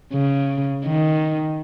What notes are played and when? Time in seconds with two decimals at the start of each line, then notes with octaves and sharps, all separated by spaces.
0.13 C#3
0.85 D#3